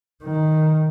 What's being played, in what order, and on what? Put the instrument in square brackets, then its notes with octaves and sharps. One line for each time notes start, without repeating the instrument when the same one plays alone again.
[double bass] D#3